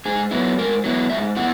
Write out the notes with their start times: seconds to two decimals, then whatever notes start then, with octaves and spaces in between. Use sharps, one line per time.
0.05 G#2 G#4
0.31 F#3 B3 E4
0.58 G#2 A#4
0.84 F#3 B3 E4
1.10 G#2 E5
1.37 B3 E4 F#5